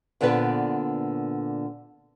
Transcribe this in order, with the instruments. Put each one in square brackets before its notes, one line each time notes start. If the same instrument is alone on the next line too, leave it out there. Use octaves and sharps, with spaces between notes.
[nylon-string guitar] A#2 D3 B3 C4 B4